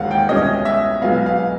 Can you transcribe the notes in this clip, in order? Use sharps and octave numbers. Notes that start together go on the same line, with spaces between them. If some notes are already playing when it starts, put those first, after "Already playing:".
Already playing: E1 D#2 D#3 G#3 F5 F#5
G5
C2 B2 G#3 C#4 D#5
E5
B1 B2 G#3 B3 F5
F5